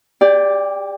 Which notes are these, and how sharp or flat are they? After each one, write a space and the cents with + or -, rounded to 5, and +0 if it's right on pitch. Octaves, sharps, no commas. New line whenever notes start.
G4 +40 D5 +0 G5 +0